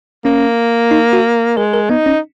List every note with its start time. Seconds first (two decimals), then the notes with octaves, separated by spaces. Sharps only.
0.24 A#3 C#4
0.91 D#4
1.13 F#4
1.57 G#3 A#4
1.73 A#4
1.90 B3 D#4
2.06 C#4